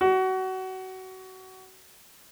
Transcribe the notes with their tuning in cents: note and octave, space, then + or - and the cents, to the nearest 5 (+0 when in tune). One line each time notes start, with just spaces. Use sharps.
F#4 +25